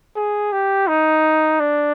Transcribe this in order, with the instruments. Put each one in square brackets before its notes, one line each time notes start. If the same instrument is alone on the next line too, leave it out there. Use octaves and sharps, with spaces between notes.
[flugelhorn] G#4
G4
D#4
D4